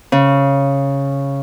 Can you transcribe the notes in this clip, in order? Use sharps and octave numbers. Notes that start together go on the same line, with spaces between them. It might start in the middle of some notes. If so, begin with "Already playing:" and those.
C#3